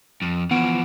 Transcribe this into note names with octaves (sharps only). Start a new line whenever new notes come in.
F2
E3 F3 B3 D7